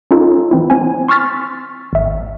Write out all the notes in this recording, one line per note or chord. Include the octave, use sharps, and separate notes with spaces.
C#4 D#4 F4 A4
E3 C4 E4
C4 G#5
C6 C#6 E6 F6 A6 B6
G#1 E5